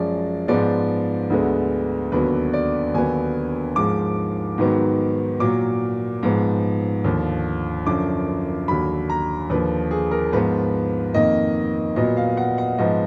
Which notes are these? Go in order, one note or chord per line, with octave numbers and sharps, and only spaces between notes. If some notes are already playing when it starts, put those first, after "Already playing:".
Already playing: F#2 F3 G#3 D5
G#2 F3 G#3 B3 D5
D2 D3 G#3 B3
D#2 D3 F#3 B3 B4
D5
D#2 D3 F#3 B3 G#5
G#2 F3 G#3 D6
G#2 D#3 F#3 B3
A#2 F#3 A#3 D6
G#2 F3 B3
D#2 D3 F3
F#2 D3 F3 D6
D#2 D3 F#3 B5
A#5
D#2 D3 F3 B4
G#4
A#4
G#2 F3 B3 B4
F2 D#3 A#3 D#5
A#2 F#3 B3 D#5
F5
F#5
F#5
G#2 F3 B3 D#5